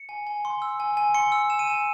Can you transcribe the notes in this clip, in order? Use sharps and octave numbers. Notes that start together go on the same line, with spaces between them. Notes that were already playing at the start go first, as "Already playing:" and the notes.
Already playing: C#7
G#5
G#5
C6
E6
G#5
G#5
C6 C#7
E6
G#5 E7
D#7
G#5 E7